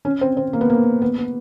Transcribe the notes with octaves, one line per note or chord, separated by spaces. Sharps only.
C#4
C4
C4
A#3
B3
A#3
B3
B3